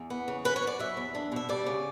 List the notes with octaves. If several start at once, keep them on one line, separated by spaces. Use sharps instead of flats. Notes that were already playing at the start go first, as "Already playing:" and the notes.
Already playing: E2
B3
C#3
F#3 B4
C#5
F#2 D5
F#3 E5
E2
D4
B2 E5
G3 D5
C#3